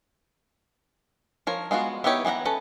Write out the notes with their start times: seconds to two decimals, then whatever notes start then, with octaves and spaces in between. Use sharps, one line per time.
1.47 F3 A#4 C#5
1.71 G#3 B3 F4 F#4
2.04 B3 D#4 E4 G4 C#5
2.25 E3 B3 D4 F#5 A#5
2.45 C#4 A4 B4 A5